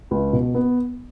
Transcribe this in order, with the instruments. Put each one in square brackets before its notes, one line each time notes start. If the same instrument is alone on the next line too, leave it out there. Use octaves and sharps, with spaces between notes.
[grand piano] C#2
B2
B3